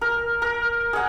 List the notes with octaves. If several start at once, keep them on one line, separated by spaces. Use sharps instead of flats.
A#4
A#4
G#4 F#5